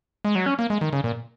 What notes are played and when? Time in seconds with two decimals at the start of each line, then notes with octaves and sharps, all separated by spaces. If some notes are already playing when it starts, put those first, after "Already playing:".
0.25 G#3
0.35 F#3
0.46 C#4
0.59 A#3
0.70 G#3
0.81 D#3
0.93 C#3
1.04 A#2